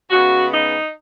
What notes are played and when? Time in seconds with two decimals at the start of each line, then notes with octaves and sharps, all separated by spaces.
0.10 C#3 G#3 B3 F#4
0.51 D#4